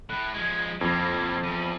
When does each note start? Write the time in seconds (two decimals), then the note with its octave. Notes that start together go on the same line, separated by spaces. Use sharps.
0.10 A2 F#6
0.34 F3 G#3 G#6
0.81 F2 A2 A#3 G#6
1.43 E2 D#7